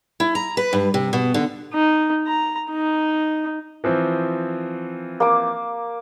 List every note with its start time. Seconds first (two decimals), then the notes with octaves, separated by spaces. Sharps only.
0.20 E4
0.35 A#5
0.57 B4
0.73 G2
0.94 C3
1.13 B2
1.34 D3
1.74 D#4
2.27 A#5
2.71 D#4
3.84 E3 F3 C4
5.20 A#3 D6